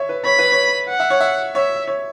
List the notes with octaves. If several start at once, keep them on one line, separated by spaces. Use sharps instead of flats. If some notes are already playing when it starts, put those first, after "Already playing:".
Already playing: C#5 E5
B4
C#5 B5
B4
C#5
F#5
E5
C#5
E5
C#5 E5
C#5